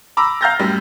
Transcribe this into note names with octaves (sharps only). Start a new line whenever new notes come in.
A#5 B5 D6 E6 A#6
F5 A#5 F6 G6 A6 A#6
F#2 A2 G3